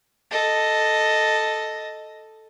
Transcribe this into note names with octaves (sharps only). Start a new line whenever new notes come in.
A4 D#5